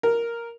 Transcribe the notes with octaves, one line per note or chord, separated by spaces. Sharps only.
A#4